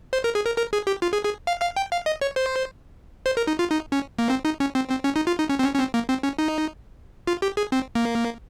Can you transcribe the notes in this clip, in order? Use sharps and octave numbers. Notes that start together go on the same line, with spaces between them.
C5
A#4
G#4
A#4
A#4
G#4
G4
F4
G#4
G#4
F5
F5
G5
F5
D#5
C#5
C5
C5
A#4
D#4
F4
D#4
C#4
A#3
C4
D#4
C#4
C4
C4
C#4
D#4
F4
D#4
C#4
C4
C#4
C#4
C4
A#3
C4
C#4
D#4
F4
G4
G#4
C4
A#3